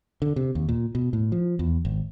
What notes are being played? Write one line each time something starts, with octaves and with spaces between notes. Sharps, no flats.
D3
C3
D#2
A#2
B2
A2
F3
E2
G#1